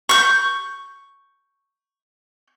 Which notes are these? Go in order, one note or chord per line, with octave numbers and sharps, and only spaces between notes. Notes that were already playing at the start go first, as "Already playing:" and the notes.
C#6 G6